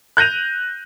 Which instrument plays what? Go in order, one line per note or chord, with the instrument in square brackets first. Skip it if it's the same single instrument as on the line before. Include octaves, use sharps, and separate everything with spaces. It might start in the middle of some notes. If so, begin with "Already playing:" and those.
[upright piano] F#6 G6 A#6 D#7 F7